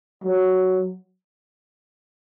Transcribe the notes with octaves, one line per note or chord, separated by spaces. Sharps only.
F#3